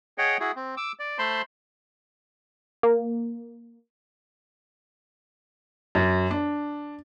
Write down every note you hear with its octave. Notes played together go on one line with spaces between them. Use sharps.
G#4 C#5 D#5 F#5 G5
E4 F#4 G#4
C4
D6 E6
D5
A3 C5 A5 B5 C6
A#3
F#2
D4